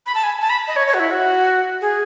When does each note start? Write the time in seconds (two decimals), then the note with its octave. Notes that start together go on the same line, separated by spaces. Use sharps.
0.06 B5
0.15 A5
0.24 G#5
0.41 A5
0.50 B5
0.68 D#5
0.76 C#5
0.87 C#5
0.94 F#4
1.00 E4
1.11 F#4
1.81 G#4